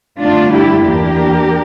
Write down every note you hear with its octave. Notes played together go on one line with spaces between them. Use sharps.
G2 D3 A3 D4 F4
E4 G4
E2 E3 A#3 D4 G4 A#4